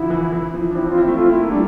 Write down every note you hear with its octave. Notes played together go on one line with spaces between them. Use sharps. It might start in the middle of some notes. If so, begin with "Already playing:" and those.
Already playing: D3 F3 E4
E3
E3
F3
D4
C4 E4
C4
F4
C4
A3 E4
A3 F4
A3 E4
A#3
G3 D4